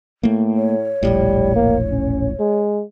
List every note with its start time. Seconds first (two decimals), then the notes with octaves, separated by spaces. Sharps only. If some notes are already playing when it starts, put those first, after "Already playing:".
0.23 A2 A3 A#3
0.56 C#5
1.03 E1 A#1 A2 G3
1.56 A#3
1.90 C#4
2.39 G#3